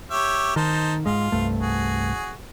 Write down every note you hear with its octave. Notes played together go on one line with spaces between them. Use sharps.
G4 C#5 E5
D#3 D#4 C5 A5
G#2 G#3 F4
C2 G2 A3
F#4 G#4